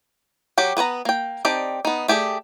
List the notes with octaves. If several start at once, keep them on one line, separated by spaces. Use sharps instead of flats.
F#3 F#4 G4
B3 B4 C#5 A#5
A#3 G5
C4 D#4 G4 D5 A5
B3 D#4
A3 G4 G#4 D5